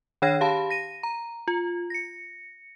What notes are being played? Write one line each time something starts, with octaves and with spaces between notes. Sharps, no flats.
D#3 D4 C#5 G5 G#6 A#6
G4 F5 A5 B5
A#6 D#7
A#5
F4
A#6 C#7